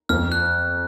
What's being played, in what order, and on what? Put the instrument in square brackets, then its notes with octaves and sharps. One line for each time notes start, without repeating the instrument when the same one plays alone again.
[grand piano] F2 [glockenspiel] F6
[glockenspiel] F#6